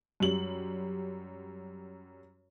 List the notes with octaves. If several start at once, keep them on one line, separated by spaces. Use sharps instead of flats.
F#2 G3 F#7